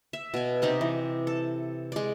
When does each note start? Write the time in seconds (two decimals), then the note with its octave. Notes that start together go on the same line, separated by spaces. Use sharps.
0.13 E5
0.34 B2 G#5
0.62 C3 C4 D#4 G4
0.81 E3
1.27 A4
1.92 G#3 D5